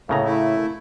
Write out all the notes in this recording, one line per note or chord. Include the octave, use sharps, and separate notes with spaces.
A2 C#3 A#3 A#5
A3 E4